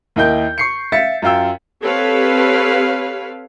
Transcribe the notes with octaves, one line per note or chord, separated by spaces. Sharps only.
D#2 A#3 E4 D#5 G5 G6
C#6 C7 C#7
E5 F5 A6 B6 C#7
F#2 F4 F5 G5 E6
C4 G4 A4 B4 C#5 F5